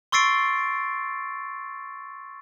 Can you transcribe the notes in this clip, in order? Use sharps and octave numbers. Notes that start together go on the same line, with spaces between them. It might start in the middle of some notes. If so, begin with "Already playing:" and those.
C6 C#6 E6 A6 C7 D7